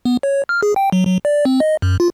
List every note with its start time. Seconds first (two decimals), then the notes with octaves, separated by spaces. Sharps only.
0.05 B3
0.23 C#5
0.49 F6
0.63 G#4
0.76 G5
0.92 F#3
1.07 F#3
1.25 D5
1.45 C4
1.60 D#5
1.82 F#2
2.00 F4